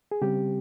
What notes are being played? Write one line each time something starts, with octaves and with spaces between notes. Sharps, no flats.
G#4
C#3 G3 C4 G4